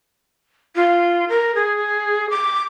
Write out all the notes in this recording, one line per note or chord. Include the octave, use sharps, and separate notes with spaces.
F4
A#4
G#4
D6